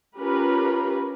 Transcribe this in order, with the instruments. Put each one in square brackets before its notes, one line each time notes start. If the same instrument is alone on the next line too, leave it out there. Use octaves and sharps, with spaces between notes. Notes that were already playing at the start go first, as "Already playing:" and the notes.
[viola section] C#4 F4 G4 A#4 B4